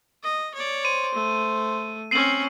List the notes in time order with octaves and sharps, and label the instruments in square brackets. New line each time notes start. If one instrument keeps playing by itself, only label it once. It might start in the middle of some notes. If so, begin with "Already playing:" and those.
[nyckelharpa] D#5
C#5 D5
[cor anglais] C5 [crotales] D#7
[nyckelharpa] A3
[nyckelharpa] C4 C#4 [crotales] C7 D#7 F#7